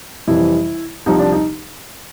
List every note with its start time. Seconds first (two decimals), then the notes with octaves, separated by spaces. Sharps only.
0.28 F2 C3 E3 G3 E4
1.06 C2 C3 F3 D#4
1.19 D4
1.32 D#4